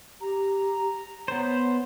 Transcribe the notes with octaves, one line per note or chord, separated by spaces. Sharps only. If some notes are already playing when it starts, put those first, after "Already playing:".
G4 A#5
B3 C5 C#5